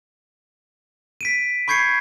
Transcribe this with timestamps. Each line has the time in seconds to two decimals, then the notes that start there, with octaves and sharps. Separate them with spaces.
1.21 B6 D7 D#7
1.68 B5 C#6 G6 G#6 C7 C#7